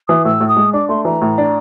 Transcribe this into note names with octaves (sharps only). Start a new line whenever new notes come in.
E3 D#6
A2 E6
A2
D#6
G#3
D4 D6
A3 C6
E3 A#5
A2
D4